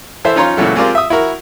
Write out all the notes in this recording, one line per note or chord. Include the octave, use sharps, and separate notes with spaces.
E3 A4 C5 E5
C#4 D#4 F4 C#5 A#5 C6
A#2 C#3 E3 F#3 A3
G#3 C4 F4 G4 A#4 D5
E5 D#6
E4 F#4 A#4